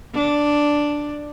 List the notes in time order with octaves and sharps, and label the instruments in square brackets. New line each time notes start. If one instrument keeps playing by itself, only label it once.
[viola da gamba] D4